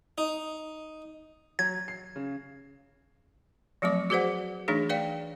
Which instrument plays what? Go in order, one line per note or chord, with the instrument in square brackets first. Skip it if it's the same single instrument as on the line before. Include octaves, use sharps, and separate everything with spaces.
[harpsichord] D#4
[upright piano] F#3 [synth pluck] G#6
[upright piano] C7
C#3
[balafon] F3 F#3 A3 C4 D6
F#4 G#4 B4 C5 D5 F#5
E3 A3 D4 D#4 G#4
B4 D5 F5 G5